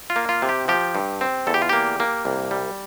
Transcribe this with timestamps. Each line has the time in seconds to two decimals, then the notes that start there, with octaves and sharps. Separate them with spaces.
0.10 F4
0.16 A#3
0.29 F4
0.42 C3
0.49 G4
0.68 F3 G4
0.95 G2
1.21 C4
1.47 E2 A4
1.54 G4
1.62 F4
1.69 A#3 G4
2.00 A#3
2.25 C2
2.51 G3